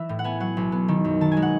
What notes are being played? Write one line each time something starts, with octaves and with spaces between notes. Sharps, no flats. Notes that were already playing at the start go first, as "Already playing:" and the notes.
Already playing: E3 E5
A2
F#5
B3 G#5
F#3 F#5
B1
B3
D#3
F#2
D#3 A5
G#5
G#3
F#5